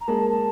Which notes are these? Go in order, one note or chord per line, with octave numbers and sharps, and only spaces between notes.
A#5
G#3 A#3 A5
A5